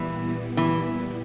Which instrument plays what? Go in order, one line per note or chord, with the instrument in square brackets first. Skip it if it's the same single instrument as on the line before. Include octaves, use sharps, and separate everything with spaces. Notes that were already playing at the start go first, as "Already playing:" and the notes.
Already playing: [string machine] A#2 G3 B3 E4 [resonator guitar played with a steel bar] E3
[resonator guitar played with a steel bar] E3